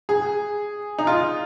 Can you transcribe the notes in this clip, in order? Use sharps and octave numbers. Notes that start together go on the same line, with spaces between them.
G#4
D#4
F4